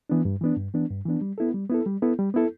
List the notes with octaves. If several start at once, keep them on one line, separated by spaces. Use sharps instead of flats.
E3 B3 D4
G2
E3 B3 D4
G2
E3 B3 D4
G2
E3 B3 D4
G3
B3 E4 A4
G3
B3 E4 A4
G3
B3 E4 A4
G3
B3 E4 A4